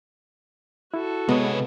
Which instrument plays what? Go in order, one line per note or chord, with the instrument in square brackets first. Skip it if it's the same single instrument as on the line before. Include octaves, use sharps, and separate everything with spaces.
[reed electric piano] E4 [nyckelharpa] F#4 A4
[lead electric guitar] C3 C#5 [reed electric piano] G#3 [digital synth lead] B3